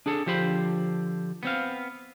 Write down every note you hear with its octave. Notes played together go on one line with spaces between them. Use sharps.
D4 G#4 A4
D3 F3 G4 C5 A5 B5
B3 C4 F5